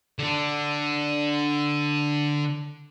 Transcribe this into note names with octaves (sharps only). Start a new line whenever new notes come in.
D3 D4